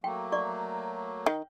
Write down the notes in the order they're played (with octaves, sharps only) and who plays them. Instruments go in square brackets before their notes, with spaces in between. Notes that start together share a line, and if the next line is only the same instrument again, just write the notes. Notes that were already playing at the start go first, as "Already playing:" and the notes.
[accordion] F#3 A3 A#3 [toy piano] G5
[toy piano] D5 C#6
[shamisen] D#3